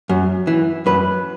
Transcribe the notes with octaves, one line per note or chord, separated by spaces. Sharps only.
F#2
E3
F#2 B4